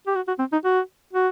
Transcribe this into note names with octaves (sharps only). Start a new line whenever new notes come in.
G4
F#4
F#4
C4
D#4
F#4
F#4